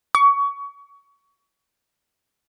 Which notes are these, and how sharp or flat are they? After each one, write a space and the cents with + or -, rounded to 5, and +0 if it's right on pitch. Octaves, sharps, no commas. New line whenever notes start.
C#6 +25